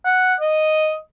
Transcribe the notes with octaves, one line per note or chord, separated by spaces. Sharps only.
F#5
D#5